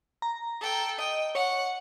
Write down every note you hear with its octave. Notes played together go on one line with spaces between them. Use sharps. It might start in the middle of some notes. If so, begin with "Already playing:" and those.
A#5
A4 G5
D#5 G5
C#5 F#5